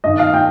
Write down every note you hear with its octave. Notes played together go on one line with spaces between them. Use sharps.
G2 D#3 D#5
F5
G5